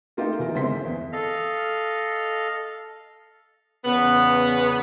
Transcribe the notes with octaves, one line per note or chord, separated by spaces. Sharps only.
A3 A#3 D#4 F4 G4 E5
F#1 E3 B3 A#4
G1 F#2 G#3 C4 C6 B6
E5
E2
A4 D#5 F5 F6
E2 C#3 B3